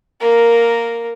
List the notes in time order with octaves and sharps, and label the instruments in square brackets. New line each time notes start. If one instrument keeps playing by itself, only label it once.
[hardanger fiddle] A#3 A#4